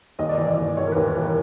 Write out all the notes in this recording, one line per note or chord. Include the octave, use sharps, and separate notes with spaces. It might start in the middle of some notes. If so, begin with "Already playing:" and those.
D#2 D#5
D5
E3 D#5
D5
D#2
D#2 C#5
A#4
D#2 B4
B4
E3 A#4